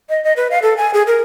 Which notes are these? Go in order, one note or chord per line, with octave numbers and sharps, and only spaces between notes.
D#5
D#5
B4
F5
A4
G#5
G#4
A#4